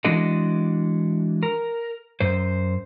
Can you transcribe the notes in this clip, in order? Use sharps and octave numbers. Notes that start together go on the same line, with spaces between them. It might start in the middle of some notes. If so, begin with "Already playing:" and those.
E3 G#3 D4 F#4 A4 D#5
A#4
F#2 C5